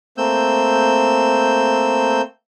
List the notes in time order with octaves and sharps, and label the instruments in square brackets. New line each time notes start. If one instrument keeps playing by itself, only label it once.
[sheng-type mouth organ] A3 A#3 C4 E6 G6